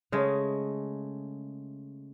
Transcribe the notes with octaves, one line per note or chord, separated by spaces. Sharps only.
C#3 G#3 A3